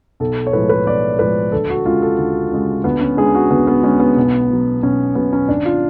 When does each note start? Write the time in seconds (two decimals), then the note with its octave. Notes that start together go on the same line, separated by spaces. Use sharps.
0.20 B1 A4
0.46 C#5
0.53 A2 F3 G#3 B4
0.69 B4
0.86 B1 D5
1.19 A2 F3 G#3 B4
1.52 D2 A4
1.70 F#4
1.85 C#3 G#3 F4
2.02 A4
2.18 D2
2.52 C#3 G#3
2.84 D2 B3
3.01 C#4
3.17 D3 G#3 G#4
3.35 F#4
3.50 D2 B3
3.67 B3
3.83 D3 G#3 C#4
4.00 B3
4.17 B1
4.50 B2 F#3
4.83 B1 C#4
5.15 B2 F#3 B3
5.33 C#4
5.48 G#1 D4
5.65 F4